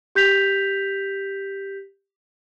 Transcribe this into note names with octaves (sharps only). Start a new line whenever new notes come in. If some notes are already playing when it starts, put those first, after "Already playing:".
G4 G6 B6 F7